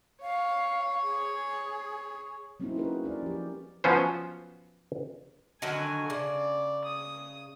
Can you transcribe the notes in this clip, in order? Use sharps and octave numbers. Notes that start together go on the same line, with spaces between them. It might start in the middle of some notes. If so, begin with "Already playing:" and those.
C#5 F5
G#4
F#3 A#3 C4 C#4 D#4 E4
C#4 D#4 F#4 G#4 A#4 B4
C#4 A#4 D5
F3 G4
F3 F#3 B3 C#4 C5
D3 D#3 F#3 G#5
C#3 D5
D#6